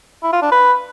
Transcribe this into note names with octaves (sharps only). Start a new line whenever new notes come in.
E4
F4
D4
B4